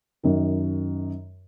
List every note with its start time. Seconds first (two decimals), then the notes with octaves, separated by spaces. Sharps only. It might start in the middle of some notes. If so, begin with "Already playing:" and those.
0.23 F#2 D#3